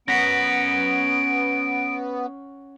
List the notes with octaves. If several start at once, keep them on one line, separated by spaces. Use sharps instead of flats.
B3 C#4 F#5 A#6 B6 D7